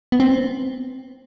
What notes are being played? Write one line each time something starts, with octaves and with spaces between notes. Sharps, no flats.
B3
C4